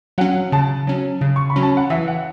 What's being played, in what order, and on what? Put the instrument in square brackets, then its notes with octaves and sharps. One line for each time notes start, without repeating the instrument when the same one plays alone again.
[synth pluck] F#3 C#4 [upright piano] F#5
[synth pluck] C#3 [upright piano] A5
[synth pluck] F#3 C#4
C#3
[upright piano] C#6
B5
[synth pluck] F#3 C#4
[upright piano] A5
F#5
[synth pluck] E3 [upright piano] E5
[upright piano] F#5